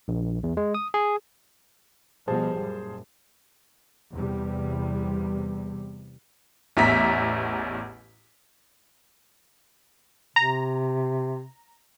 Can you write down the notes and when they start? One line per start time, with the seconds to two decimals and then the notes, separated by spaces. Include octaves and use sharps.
0.08 A#1
0.43 E2
0.57 G#3
0.74 D#6
0.94 G#4
2.28 B2 F3 G3 G#4 C5 A5
2.60 F#2 A#2
4.11 E2 C3 G3
6.77 A1 E2 E5 A#5 B6
10.36 C3 A#5